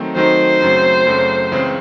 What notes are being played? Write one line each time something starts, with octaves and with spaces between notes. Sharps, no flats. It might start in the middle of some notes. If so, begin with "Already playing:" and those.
Already playing: D#3 F#3 A3 C4 D#4
D#3 F#3 A3 C4 D#4 C5
F#2 C#3 F#3 A3 C4
F#2 C#3 F#3 A3 C4
C#2 C#3 E3 C4